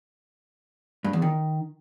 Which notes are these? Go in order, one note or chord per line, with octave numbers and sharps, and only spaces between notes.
G2
E2
D#3